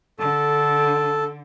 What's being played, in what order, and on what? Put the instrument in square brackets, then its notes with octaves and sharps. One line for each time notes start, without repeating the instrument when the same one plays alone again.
[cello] D3 [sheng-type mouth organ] A4